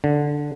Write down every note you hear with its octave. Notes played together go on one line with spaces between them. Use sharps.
D3